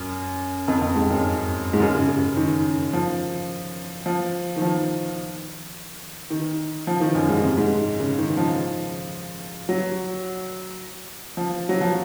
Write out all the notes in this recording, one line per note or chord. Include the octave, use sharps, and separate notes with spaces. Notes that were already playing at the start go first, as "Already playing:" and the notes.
Already playing: F#2
F2
F2
G#2
F#2
G#2
F#2
C#3
C#3
D#3
F3
F3
D#3
F3
D#3
F3
D#3
F#2
G#2
C3
G#2
C#3
D#3
F3
F#3
F3
F#3
F3